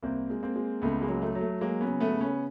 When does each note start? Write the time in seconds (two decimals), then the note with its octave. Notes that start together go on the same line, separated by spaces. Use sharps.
0.03 C2 A#3 C4
0.30 G#3
0.43 A#3 C4
0.56 G#3
0.82 C#2 A3 B3
1.02 G#3 A#3
1.08 F#3
1.22 A3
1.35 F#3
1.41 A3
1.61 F#3 G#3 A#3
1.81 B3 C#4
1.88 C#3
2.00 A3 B3
2.13 C#3
2.21 B3 C#4